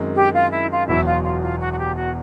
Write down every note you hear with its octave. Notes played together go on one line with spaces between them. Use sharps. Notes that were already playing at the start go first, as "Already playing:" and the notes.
Already playing: F#2 D#3 G#3 C4
G4
F4
E4
F4
E1 E2 B2 F#3 E4
F4
F4
F4
F#4
F#4
G4
F#4